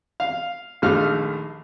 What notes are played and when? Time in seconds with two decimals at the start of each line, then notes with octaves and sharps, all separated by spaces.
0.20 F5
0.82 A#1 D#2 A3 F5 F6